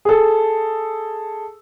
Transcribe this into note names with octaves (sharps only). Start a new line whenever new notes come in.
G#4 A4